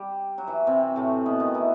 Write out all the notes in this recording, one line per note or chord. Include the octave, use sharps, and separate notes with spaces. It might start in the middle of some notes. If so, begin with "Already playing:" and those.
Already playing: G3 G4
F#3 F#4
E3 E4
C3 C4
A2 A3
B2 B3
D#3 D#4
E3 E4